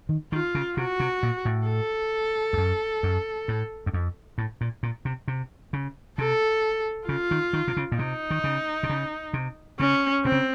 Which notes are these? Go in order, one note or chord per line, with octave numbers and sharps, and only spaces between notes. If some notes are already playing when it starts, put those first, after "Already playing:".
D#3
D#3 F4
C#3
C3 F#4
C3
A#2
A2
A4
F2
F#2
F#2
A2
F#2
F2
A2
A#2
A#2
C3
C3
C#3
C3 A4
C#3 F4
D#3
D#3
C3
C#3
A#2
C3 D#4
D#3
C#3
C3
C#3
C3
C#3 C#4
C3 C4
C#3